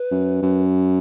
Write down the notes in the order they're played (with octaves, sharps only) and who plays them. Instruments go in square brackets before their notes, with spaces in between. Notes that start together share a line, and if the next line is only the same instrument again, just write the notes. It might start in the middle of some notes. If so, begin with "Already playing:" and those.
Already playing: [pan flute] B4
[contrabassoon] F#2
F#2